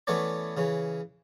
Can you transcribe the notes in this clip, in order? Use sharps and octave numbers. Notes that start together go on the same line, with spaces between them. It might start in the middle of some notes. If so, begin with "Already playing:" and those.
E3 A3 B3 C#4 C#5 D5
C#3 E3 C#4